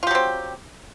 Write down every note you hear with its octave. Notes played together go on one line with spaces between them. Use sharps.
F#3 C4 F4 G4